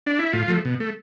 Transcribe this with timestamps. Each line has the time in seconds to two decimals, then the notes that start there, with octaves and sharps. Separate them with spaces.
0.07 D4
0.19 E4
0.33 A2 F4
0.48 F3 A3
0.65 B2
0.80 A3